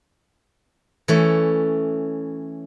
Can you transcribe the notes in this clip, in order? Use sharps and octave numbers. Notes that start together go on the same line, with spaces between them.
E3 A3 C#4